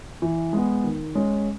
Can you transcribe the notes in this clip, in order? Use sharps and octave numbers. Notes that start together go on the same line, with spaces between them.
E3
G#3 B3
D#3
G#3 C#4